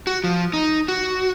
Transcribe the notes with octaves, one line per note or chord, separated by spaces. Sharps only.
F#4
F3
D#4
F#4